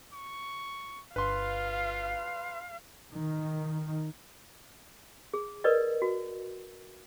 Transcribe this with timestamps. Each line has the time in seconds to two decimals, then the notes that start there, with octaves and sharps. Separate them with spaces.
0.14 C#6
1.16 G1 F4 B4 F5 C6
3.11 D#3
5.34 G#4
5.64 A#4 B4 D5 D#5
6.02 F#4